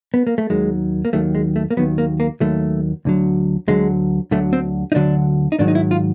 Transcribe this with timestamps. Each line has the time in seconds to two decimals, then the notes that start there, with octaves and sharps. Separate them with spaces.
0.14 B3
0.27 A#3
0.38 A3
0.50 D#2 D#3 F#3 G#3
1.05 A#3
1.13 D#2 D#3 F#3 A3
1.35 G#3
1.56 A3
1.71 A#3
1.77 D#2 D#3 F#3 B3
1.98 A#3
2.20 A#3
2.40 D#2 D#3 F#3 A3
3.05 D2 D3 F#3
3.68 D2 D3 F#3 G#3
4.31 D2 D3 F#3 A3
4.53 C4
4.92 D#4
4.95 D2 D3 F#3 D4
5.52 D#4
5.59 G#2 D#3 F#3 D4
5.68 D#4
5.75 E4
5.91 F4